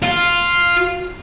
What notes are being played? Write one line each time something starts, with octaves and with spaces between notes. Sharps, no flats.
F4